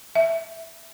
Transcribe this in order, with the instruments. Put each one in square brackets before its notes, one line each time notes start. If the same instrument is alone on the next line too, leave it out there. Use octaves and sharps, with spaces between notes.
[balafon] E5